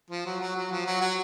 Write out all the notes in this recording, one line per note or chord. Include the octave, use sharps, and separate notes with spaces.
F3
F#3
F#3
F#3
F3
F#3
F#3